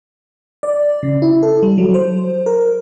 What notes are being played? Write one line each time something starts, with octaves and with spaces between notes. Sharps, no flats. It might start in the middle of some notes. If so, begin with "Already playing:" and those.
D5
C#3
E4
A4
G3
F#3
C5
A#4